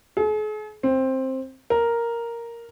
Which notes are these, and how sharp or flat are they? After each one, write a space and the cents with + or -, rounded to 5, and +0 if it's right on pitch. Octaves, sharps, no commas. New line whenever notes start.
G#4 +45
C4 +10
A#4 +0